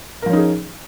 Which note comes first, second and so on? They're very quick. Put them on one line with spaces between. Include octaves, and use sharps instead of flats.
A#4 F3 C#4 D#4 G#4